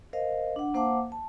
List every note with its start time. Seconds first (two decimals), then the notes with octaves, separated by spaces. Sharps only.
0.13 A#4 C5 D#5 F5
0.56 D4 F#5
0.74 A#3 C5 F5 F#5 A5 D6
1.12 A5